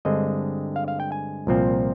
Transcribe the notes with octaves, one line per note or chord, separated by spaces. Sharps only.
G2 D3 G#3 C4 D#5
F5
F5
G5
G#5
C2 A#2 F3 C4